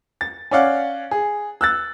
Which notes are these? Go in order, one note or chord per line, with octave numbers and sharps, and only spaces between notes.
A6
C#4 C#5 D5 F5 F#5
G#4
E6 F#6 A6